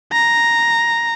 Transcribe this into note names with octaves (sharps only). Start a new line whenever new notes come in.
A#5